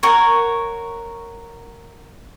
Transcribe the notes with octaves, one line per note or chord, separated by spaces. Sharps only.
F#4 A#4 C#5